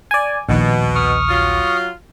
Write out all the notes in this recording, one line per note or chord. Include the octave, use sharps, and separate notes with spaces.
D5 G#5
A#1 D#2 B2
C#6 D#6 F6
F#3 F4